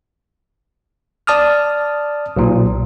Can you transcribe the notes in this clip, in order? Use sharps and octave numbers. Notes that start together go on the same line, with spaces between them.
D5 A5 D#6 F6
B1 A#2